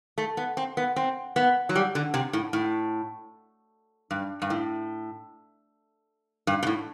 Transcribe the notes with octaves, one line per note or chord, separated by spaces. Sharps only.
A3
B3
C4
B3
C4
B3
F#3
G3
D3
C3
A2
A2
G2
G2
A2
G2
B2
A2